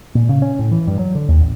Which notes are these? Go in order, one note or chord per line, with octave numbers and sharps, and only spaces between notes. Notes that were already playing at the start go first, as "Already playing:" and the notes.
A#2
C#3
C#4
A2
E3
G2
F#3
D3
D#2
A1